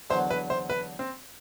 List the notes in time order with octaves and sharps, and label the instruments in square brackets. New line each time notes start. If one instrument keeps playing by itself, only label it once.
[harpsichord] E2 D3 F#3 [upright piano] C5
[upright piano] B4
C5
B4
C4